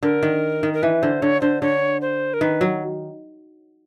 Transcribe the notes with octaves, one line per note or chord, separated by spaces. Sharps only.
D3 A#4
D#3
D#3
A#4
E3 B4
D3 C5
D3 C#5
D3 C5
D3 C#5
C5
A#4
D#3 B4
F#3